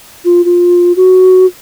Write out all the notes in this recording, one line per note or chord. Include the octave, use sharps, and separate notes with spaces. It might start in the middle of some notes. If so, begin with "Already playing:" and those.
F4
F4
F#4